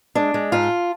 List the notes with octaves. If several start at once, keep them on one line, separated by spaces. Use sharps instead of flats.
G#3 D4
G#3
G#2 F4